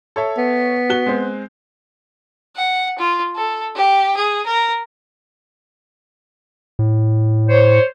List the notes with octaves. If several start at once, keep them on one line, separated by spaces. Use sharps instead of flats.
A4 C#5 E5
B3
F#4 F#6 G7
G#3 C4
F#5
F4
A4
G4
G#4
A#4
A2
C5 C#5